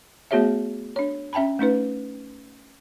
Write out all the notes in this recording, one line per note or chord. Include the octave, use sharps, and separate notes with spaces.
A3 B3 F#4 G#4 C#5 E5
D4 C#5
C#4 E5 G5 A5 B5
A3 C#4 D#4 B4